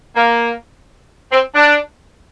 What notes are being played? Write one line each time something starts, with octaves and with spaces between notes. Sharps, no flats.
A#3
C4
D4